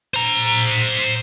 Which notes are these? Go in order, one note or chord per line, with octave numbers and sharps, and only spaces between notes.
C5 A#5